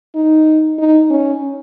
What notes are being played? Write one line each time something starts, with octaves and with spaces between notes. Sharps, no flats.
D#4
D#4
C#4